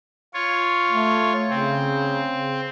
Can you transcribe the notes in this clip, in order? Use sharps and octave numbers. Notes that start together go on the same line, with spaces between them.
F4 C#5
A3
C#3 C4